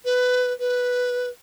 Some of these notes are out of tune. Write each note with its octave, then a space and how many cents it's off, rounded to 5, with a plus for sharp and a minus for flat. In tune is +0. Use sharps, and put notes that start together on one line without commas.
B4 +15
B4 -5